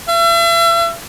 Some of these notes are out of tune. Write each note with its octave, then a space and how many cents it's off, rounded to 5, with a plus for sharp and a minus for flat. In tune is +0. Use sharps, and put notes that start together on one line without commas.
E5 +40